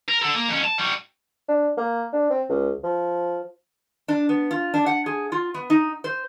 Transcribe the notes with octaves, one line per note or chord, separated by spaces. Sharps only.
A#4
A4 F#5
A#3
F2 C#4
A5
G3 F#4
D4
A#3
D4
C4
C#2
F3
D4
B3
F4
D4
F#5
G#4
F4
B3
D#4
C5